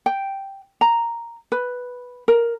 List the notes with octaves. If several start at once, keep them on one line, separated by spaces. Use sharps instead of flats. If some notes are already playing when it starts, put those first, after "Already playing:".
G5
A#5
B4
A#4